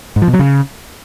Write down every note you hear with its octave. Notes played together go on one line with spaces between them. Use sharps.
G#2
F3
B2
F#3
C#3